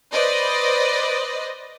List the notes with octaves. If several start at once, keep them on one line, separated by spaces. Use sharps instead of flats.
B4 C5 D5 D#5